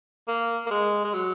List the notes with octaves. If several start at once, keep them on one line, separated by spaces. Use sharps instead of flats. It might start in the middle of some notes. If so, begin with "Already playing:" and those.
A#3
A#3
G#3
G#3
F#3